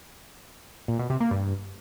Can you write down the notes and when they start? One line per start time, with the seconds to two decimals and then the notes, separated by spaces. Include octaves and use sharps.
0.88 A#2
0.99 B2
1.10 C3
1.20 A#3
1.31 G2